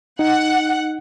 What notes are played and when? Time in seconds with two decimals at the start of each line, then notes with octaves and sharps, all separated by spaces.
0.19 D#4 F#5